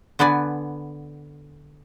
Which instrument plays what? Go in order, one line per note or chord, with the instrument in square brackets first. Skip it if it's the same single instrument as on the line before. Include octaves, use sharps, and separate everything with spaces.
[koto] D3 B3 B4 D5 G#5